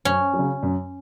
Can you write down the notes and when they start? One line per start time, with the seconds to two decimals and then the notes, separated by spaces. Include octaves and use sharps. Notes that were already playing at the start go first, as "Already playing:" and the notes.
0.05 F#2 C#4
0.33 F#3
0.39 C#3
0.63 F#2